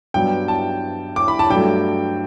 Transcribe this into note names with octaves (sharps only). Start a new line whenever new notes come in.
G2 F#3 B3 G5
A5
D6
B5
A5
G2 F#3 A3 G5